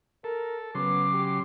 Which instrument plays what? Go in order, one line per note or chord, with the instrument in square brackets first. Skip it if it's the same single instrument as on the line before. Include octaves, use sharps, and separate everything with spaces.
[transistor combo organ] A4 [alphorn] A#4
[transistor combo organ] C#3 F#3 C6 [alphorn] B3 [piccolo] D6
[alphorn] G4